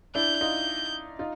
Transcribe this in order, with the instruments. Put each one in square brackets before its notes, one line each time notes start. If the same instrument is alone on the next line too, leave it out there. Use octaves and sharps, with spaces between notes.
[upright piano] D4 E4 [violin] G6
[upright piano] D#4 F4
D#4 F4